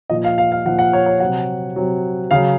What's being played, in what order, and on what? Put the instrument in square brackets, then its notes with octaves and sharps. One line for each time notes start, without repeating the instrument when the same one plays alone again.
[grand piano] A#2 F3 D#5
F5
F5
F5
A#2 F3 F#5
F#5
C#5
C#5
C3 F#3 F#5
C3 F#3
C#3 F#3 F5